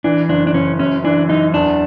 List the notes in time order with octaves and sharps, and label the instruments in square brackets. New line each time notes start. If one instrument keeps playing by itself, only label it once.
[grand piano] E3 [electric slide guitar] D4
[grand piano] F#1 [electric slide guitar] D4
[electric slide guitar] D4
[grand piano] F#1 [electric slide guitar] C#4
[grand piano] F#2 [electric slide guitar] C#4
[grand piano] E3 [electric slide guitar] D4
[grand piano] F#2 [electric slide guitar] D#4
[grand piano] E2 [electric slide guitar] D4